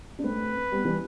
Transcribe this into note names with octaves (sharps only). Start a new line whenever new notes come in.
D4
A3 C4 B4
G3 B3
E3 G3